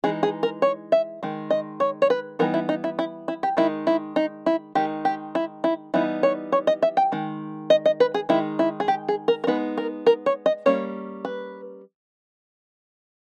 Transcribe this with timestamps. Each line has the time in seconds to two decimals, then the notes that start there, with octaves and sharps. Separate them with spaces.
0.04 E3 G#3 D#4 G#4
0.23 G#4
0.43 A#4
0.62 C#5
0.92 E5
1.23 D#3 G#3
1.50 D#5
1.80 C#5
2.02 C#5
2.10 B4
2.39 E3 G3 B3 D#4 A#4
2.54 E4
2.69 D#4
2.84 E4
2.99 E4
3.28 E4
3.43 G4
3.57 D#3 G#3 D#4 E4
3.87 E4
4.16 D#4
4.46 E4
4.75 D#3 G#3 D#4 G4
5.05 G4
5.35 E4
5.64 E4
5.94 E3 G3 B3 D#4 E4
6.23 C#5
6.52 C#5
6.67 D#5
6.83 E5
6.97 G5
7.12 D#3 G#3
7.70 D#5
7.86 D#5
8.00 B4
8.14 G#4
8.29 D#3 G#3 D#4 E4
8.59 E4
8.80 G#4
8.88 G4
9.08 G#4
9.28 A#4
9.44 A#4
9.47 G#3 B3 D#4 B4
9.78 A#4
10.06 A#4
10.26 C#5
10.46 D#5
10.66 G3 A#3 C#4 C#5
11.25 B4